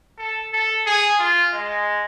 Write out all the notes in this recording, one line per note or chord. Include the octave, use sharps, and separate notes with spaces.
A4
A4
G#4
F4
G#3